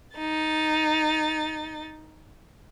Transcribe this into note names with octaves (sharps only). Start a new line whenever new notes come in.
D#4 A6